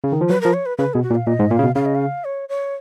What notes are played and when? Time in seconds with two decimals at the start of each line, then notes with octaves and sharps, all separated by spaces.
0.04 C#3
0.12 D#3
0.21 F3
0.29 F#3 B4
0.41 F3 A#4
0.54 C#5
0.66 B4
0.78 C#3 B4
0.93 B2 G#4
1.03 F#4
1.10 A#2
1.15 F5
1.27 A#2 D#5
1.39 G#2
1.51 A#2 F5
1.59 C#3
1.63 B2
1.75 C#3 F5
1.85 D#5
1.95 F5
2.25 C#5
2.49 C#5